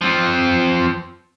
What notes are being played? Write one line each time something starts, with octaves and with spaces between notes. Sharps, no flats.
F3 C4